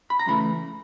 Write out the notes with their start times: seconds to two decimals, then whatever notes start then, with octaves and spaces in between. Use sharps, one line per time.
0.10 B5
0.19 A#5
0.26 F#2 C#3 E3 A3 B5